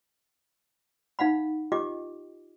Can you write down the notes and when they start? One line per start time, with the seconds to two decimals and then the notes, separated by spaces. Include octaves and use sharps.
1.19 D#4 F5 F#5 B5
1.72 F4 G4 D#5 G5 D6